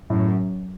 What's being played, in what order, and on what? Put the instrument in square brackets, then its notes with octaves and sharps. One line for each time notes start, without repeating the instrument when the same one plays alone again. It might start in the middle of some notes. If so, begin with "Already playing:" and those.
[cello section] F#2 [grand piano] A2